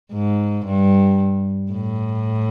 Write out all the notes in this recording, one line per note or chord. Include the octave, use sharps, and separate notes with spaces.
G#2
G2
A2